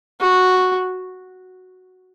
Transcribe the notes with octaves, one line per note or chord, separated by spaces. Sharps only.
F#4